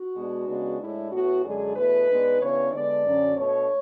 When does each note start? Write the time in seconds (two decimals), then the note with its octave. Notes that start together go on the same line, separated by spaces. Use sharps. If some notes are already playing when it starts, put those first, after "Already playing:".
Already playing: F#4
0.15 B2 G#3 B3 D4
0.48 C#3 G#3 B3 D4
0.80 A2 G#3 D4 E4
1.12 A2 E3 B3 F#4
1.44 F#2 D3 G#3 D4 G#4
1.76 E2 B2 A3 B4
2.08 G#2 G#3 B3 D4
2.41 C#3 E3 B3 D4 C#5
2.72 D3 G#3 B3 D4 D5
3.04 F#2 D3 F#3 C#4
3.37 B2 A3 D4 C#5